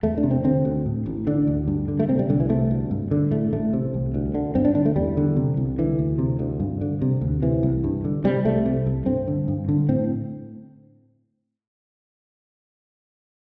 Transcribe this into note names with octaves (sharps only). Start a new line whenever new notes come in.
E2 A3
D4
C3
C4
D3 C4
D2
A2
A1
D3 D4
D2
G2
D3
A3
C3 C4
G3
C2 D3
E3
C3 A3
D2
G2
D3
A2 A3
A1 A3
C3
C2
D2
D3
G2 C4
D4
D3 D4
A3
E2 G3
D3
C3
C2
D3 E3
D2
C3
D2
G2
D3
C3
D2
C3 E3
C2
G2
D3
C3 G3
C2 A3
C3
C2
G2 C4
D3
G2
D3
A2 C4